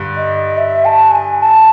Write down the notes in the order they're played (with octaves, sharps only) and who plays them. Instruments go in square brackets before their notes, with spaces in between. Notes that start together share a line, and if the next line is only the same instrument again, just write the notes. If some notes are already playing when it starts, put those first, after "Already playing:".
Already playing: [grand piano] G2 D3
[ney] D#5
E5
A5
G#5
A5